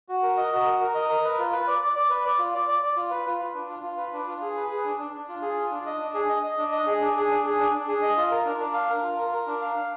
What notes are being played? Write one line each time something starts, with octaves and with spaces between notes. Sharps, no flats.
F#4
A#4
D#5
F#4
A#4
A#4
D#5
A#4
B4
F4
B4
D5
D5
D5
B4
D5
F4
D5
D5
D5
F4
B4
F4
B4
D4
F4
F4
B4
D4
F4
G#4
B4
G#4
D4
D4
D4
F4
G#4
F4
D4
D#5
D4
G#4
D#5
D#5
D4
D#5
G#4
D4
G#4
D4
G#4
D4
D4
G#4
D#5
F4
A#4
D4
D4
F5
A#4
F4
A#4
A#4
D4
F5
D4